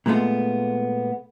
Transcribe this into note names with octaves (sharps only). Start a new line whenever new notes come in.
A#2 G#3 A3 B3 F4